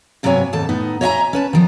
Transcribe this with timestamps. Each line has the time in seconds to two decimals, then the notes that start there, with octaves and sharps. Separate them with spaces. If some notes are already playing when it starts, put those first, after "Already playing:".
0.23 G2 C3 F#3 B3 C#5 G#5
0.53 D#2 G#2 A4 A5
0.69 A2 B3 D#4
1.01 C#5 D#5 E5 F#5 G#5 A#5
1.33 C#4 B4 A5
1.53 D#3 F3 B3